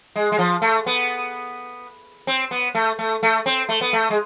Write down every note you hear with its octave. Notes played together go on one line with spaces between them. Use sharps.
G#3
G#3
F3
A3
B3
C4
B3
A3
A3
A3
C4
A3
B3
A3
G#3